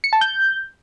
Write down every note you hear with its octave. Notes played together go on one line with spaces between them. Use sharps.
C#7
A5
G6